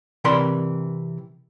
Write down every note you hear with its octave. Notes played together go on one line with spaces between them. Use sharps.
C3 E3 A#4 D5 B5 C6